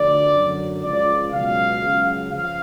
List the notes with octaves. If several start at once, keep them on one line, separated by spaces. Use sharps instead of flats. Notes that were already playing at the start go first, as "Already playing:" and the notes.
Already playing: D2 D3 F3 D5
F#2 D3 F#3
C#2 C#3 F3 D5
C#2 B2 F#3 F5
C#2 C#3 F#3
C#3 F3 F5